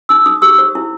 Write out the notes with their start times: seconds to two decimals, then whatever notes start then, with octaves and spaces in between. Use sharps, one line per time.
0.09 D#4 E6
0.26 D#4 D#6
0.42 G4 E6
0.59 C5
0.75 E4